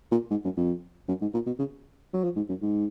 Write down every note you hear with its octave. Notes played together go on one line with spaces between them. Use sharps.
A#2
G#2
F#2
F2
F#2
G#2
A#2
B2
C#3
F#3
F3
G#2
F#2
G#2